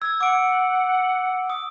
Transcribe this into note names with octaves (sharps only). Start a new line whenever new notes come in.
E6 G#6
F#5 D6 D7
D#6